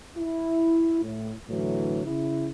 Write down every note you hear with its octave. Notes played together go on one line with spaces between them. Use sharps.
E4
A2
A2 D3 E3 F#3
C#3 E4